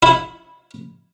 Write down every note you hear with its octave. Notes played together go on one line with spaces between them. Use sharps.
E4